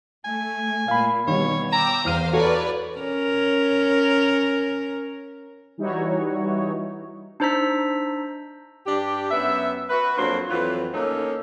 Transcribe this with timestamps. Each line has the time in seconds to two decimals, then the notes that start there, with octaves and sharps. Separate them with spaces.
0.25 A3 G#5
0.88 A#2 F5 B5
1.27 B2 D#3 G3 C#5
1.73 G5 A#5 D6 E6
2.05 E2 A#4 C5 F5 F6 D#7
2.33 F#4 A4 B4 C#5 D5
2.98 C#4 A#4
5.78 E3 G3 D#4 E4 F#4 C#5
7.40 D4 D#4 C5 A#5 E6 B6
8.86 G2 D4 G4
9.31 F#2 B3 E5
9.89 F#4 B4
10.18 F2 F#3 A#3 D4 C5
10.50 F2 E3 F#3 F4 B4
10.93 A2 A#3 C#4 D#4 A4